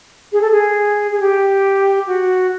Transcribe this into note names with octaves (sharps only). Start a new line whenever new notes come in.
G#4
A4
G#4
G#4
G4
F#4